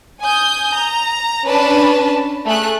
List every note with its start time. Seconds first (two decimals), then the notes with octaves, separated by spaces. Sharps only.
0.20 G#5 D#6 G6
0.74 A#5
1.49 C#4 D4 B4 A5
2.46 A3 G#4 F#6